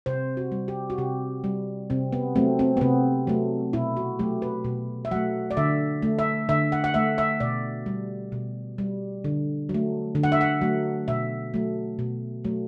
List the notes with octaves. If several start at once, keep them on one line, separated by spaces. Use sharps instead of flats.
C3 C5
F#4
G3
G4
F#4
C3 G4
G3
C3 C4
B3
F#3 A3 C4
C4
B3
C3 C4
F#3 A3
B2 E4
F#4
F#3 A3 G4
B4
B2
E5
F#3 A3 F#5
D5
D3 E5
A3
E5
D3 E5
F#5
F#5
A3 E5
E5
B2 D5
G3
B2
G3
D3
F#3
A3
D3
F#5
E5
F#5
F#3 A3
B2 E5
F#3 A3
B2
F#3 A3